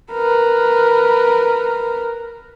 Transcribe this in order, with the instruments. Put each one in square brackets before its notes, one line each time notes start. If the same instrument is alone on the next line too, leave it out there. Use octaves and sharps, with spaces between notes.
[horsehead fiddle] A#4 B4